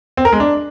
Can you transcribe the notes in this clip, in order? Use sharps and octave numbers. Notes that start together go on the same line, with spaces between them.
C4
A#4
G#3
D4